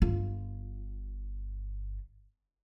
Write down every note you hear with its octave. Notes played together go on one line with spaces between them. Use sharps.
G1 F4